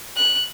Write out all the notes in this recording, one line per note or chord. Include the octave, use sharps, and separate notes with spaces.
F#6